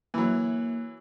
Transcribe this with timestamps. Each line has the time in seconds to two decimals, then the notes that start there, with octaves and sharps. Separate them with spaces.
0.14 E3 F#3 A#3